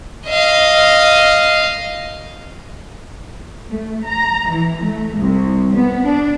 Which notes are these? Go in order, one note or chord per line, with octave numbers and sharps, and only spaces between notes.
D#5 F5
A3
A#5
E3
A3
C2
B3
D4